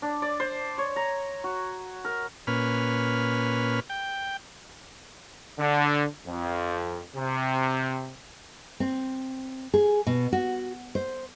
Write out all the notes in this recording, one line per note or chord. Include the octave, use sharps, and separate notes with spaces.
D4
D5
C5
C#5
A#5
F#4
A#4
A#2 C#4 B4 F6
G5
D3
F2
C3
C4
G#4
B2
F#4
C5